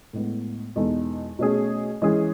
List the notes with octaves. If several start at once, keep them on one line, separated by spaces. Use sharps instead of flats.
A2 G#3 B3
E2 B2 G#3 D#4 A4
B2 A3 C#4 G#4
E3 G#3 C#4 G#4